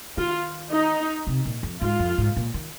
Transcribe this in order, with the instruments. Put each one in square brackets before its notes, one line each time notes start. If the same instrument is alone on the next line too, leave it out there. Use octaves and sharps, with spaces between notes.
[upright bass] D#3 [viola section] F4
[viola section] D#4
[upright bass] C3
A#2
F2
[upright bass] G#2 [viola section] F4
[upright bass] F2
G#2
A#2
D#3